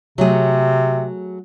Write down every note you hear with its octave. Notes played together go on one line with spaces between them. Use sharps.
C3 F#3 A3 G#4